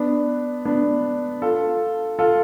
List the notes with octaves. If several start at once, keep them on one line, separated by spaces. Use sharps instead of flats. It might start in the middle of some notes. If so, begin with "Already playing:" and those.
Already playing: B3 D4
B3 D4
F4 A4
F4 A4